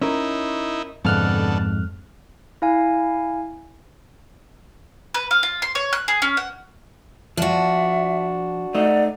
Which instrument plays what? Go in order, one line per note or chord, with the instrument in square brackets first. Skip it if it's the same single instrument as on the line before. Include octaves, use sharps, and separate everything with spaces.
[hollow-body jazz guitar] C#4 A#4 [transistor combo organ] D#4 E4
[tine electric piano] F2 F6 F#6 [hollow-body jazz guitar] G#2 [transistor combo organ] B2 D3 A4
[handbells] E4 F5 G#5
[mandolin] B4
F5
F4
C6
C#5
F#6
G#4
C#4
F#5
[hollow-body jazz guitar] F3 [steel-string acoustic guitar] D4 F#4 [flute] E5
[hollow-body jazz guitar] A3 D#4 [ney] D5 [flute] F#5